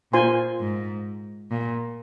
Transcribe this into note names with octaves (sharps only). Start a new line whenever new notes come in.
A#2 F4 C5 G#5 C6
G#2
A#2